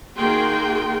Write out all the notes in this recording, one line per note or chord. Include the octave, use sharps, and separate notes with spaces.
D#3 A#3 F#4 G#4 G5 C6